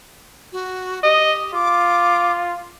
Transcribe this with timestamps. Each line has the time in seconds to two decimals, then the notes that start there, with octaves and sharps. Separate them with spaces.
0.53 F#4
1.03 G4 D#5
1.54 F4 D6